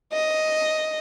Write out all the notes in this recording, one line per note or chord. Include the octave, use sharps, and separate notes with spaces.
D#5